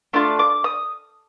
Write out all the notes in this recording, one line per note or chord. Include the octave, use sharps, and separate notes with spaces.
A3 D4 F4 D6
D6
D#6